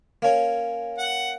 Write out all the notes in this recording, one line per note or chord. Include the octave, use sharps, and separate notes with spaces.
A#3 C#4
F#5